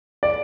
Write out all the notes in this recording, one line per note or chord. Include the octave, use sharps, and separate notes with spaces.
D5